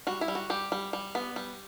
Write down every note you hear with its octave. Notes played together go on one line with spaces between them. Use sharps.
G3 F#4
E4
G3
F#4
G3 G4
G3
G3
B3
G3